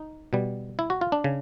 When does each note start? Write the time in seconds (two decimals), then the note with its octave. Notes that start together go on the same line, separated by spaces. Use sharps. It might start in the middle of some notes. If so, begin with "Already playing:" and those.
Already playing: D#4
0.33 B2 G3
0.79 E4
0.90 F#4
1.01 F4
1.12 D4
1.24 C#3